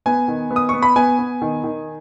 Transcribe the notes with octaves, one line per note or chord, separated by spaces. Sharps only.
B3 G#5
D#3
B3
D#6
B3 C#6
B5
B3 G#5
B3
D#3
D#3